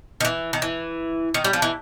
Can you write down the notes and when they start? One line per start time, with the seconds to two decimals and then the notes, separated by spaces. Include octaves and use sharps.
0.21 D#3
0.25 E3
0.53 D#3
0.62 E3
1.34 D#3
1.44 G3
1.53 F3
1.62 E3